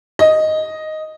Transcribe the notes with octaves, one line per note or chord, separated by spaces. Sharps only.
D#5